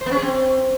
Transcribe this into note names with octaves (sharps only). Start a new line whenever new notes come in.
C5
B3
C#4
G#4
C4